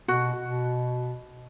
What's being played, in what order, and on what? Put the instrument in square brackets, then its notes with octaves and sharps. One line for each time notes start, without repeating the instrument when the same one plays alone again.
[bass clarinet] B2 [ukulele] F#4
[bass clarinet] B2